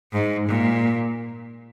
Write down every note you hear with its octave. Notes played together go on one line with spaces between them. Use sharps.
G#2
A#2